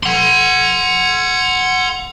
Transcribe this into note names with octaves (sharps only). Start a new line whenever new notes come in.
F#5 C6